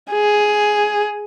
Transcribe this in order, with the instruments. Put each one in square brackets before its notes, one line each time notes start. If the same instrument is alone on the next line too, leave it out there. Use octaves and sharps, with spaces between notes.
[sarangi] G#4